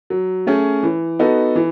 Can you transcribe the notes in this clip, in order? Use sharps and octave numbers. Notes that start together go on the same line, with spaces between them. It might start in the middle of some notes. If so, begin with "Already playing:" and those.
F#3
A3 C#4 G#4
E3
B3 D#4 F#4 A4
E3